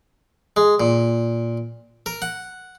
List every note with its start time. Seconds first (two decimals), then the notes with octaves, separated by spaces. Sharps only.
0.57 G#3
0.80 A#2
2.06 A#4
2.22 F#5